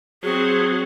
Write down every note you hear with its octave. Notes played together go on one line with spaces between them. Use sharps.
F#3 C4 G#4